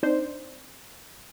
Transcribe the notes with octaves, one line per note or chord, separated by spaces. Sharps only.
C4 D4 D#4 C5